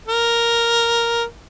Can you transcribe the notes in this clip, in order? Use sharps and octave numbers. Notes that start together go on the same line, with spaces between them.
A#4